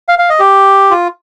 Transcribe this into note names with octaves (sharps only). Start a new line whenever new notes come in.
F5
F5
D#5
G4
F4